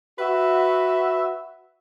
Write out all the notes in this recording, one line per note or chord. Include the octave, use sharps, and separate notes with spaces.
F#4 B4 E5